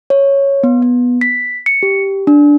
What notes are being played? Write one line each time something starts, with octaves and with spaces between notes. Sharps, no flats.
C#5
B3
B3
B6
C#7
G4
D4